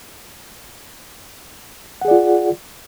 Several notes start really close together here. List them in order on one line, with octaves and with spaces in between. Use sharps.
F#5 G#4 D5 F4